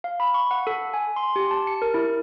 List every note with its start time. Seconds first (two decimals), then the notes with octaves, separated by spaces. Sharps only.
0.04 F5
0.20 B5
0.34 C#6
0.51 F#5
0.67 A4
0.94 G#5
1.16 C6
1.36 G4
1.51 A5
1.67 C#7
1.82 A#4
1.94 E4